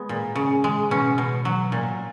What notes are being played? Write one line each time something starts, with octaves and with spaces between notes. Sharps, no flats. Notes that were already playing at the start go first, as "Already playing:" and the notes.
Already playing: G#3 B3
A#2
C#3
G#3
B2 C#4
B2
F#3
A#2